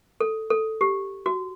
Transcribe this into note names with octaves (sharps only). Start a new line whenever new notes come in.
A4
A4
G4
F#4